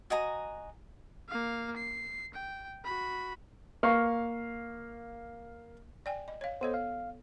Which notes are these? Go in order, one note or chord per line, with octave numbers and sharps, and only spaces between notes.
F#4 D#5 G#5 A#5
A#3 F5
C7
G5
F#4 B5
A#3 F5 C#6
D5 G5 G#5
D#5
C#5 F5
B3 A4 C5 C#5 D#5
F5